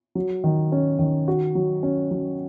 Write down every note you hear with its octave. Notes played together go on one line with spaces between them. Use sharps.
F#3
D#3
C#4
D#3
F#4
F#3
C#4
F#3